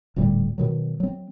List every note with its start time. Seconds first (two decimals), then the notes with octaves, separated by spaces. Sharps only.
0.16 D#1 D2 A2 G3
0.58 B2 D#3 F#3
1.00 F#3 C4